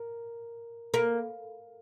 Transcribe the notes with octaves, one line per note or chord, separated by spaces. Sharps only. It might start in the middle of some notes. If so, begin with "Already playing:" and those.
Already playing: A#4
A#3